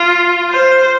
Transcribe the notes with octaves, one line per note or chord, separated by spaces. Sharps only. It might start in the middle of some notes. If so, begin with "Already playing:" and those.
Already playing: F4
C5